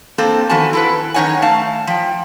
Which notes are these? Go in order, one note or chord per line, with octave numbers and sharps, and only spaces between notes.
A#3 C4 A4 C5
D#3 F3 B3 F#4 G#5 A5
E4 A4 B4
F#2 D#3 D#4 C#5 F#5 G#5
A3 F5 A5
F3 G5